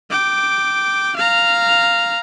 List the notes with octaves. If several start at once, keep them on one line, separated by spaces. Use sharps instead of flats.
G5 D6
F5 A#5